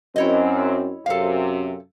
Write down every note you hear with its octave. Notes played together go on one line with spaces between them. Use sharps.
F#2 C4 E4 C#5 D#5
F#2 C3 A4 F5